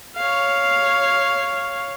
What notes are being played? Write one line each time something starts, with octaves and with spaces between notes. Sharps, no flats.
C#5 F5